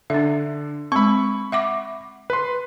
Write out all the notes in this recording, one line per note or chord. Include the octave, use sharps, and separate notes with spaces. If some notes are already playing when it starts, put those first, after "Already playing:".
D3 D4 E5
G#3 C4 B5 C#6
E5 F#5 D6
B4 C6